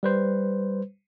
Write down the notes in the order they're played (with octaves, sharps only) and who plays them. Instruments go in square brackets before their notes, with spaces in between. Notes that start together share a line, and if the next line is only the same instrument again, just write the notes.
[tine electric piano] G3 B4 C5